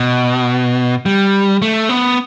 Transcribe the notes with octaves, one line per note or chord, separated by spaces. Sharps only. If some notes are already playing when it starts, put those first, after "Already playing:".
Already playing: B2
G3
A3
B3